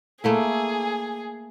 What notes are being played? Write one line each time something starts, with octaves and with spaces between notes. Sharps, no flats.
A3 A#3 E4 G#4